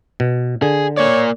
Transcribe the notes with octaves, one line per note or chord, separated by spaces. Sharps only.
B2
D3 G#4
A#3 C#5 D5